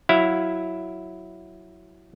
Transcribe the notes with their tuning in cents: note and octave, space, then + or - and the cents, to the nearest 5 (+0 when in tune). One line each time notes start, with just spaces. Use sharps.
F#3 +0 E4 +0 F5 +0